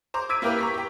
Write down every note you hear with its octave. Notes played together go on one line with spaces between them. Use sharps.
C5 A#5 D6
D6 E6 G#6 B6 D7 D#7
A#3 E4 G4 A#4 B4
A#5 C#6 B6
G4 G5